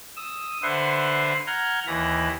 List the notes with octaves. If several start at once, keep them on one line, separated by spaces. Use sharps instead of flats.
D#6 E6
D3 B4 C5 E5 F#5 C6
F#5 A#5 F6 G6 G#6
D#2 E3 B5 A#6